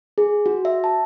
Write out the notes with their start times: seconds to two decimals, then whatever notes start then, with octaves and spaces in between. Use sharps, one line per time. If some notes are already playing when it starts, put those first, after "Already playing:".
0.18 G#4
0.46 F#4
0.65 E5
0.84 A5